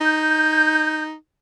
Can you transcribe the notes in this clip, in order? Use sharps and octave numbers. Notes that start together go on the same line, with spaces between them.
D#4 G6